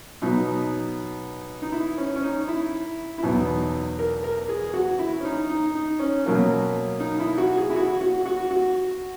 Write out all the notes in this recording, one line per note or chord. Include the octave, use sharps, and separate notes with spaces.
B2 F#3 B3 D#4
D#4
E4
C#4
C#4
D#4
E4
E4
E2 B2 F#3 B3 D#4
A#4
A#4
G#4
F#4
E4
C#4
D#4
D#4
D#4
C#4
B2 F#3 A#3 C#4
D#4
E4
F#4
G#4
E4
F#4
F#4
F#4
F#4